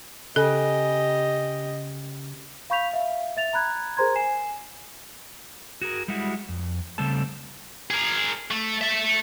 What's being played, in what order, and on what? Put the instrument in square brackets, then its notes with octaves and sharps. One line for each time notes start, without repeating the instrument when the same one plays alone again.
[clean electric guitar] C#3 [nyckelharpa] G4 D#5 [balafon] A4
[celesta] F5 B5 C#6 G6 B6 F7
E5 F5
E5 A6 F7
A#5 B5 F#6 G#6
G#4 A#4 C5 A#5 C6 G#6
G#5 C7 E7
[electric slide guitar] F#4 G#4 A#4
G3 G#3 E4 F#4
F2
C#3 G3 A3 C4 A4 A5
[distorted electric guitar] G#4 A#4
A3
A4 E5